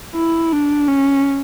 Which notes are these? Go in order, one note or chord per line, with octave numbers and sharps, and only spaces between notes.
E4
D4
C#4